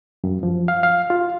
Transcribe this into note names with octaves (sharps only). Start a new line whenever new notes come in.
F#2
F3
F5
F5
F4